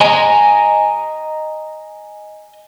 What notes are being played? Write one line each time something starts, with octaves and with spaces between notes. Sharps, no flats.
D#5 G#5 A#5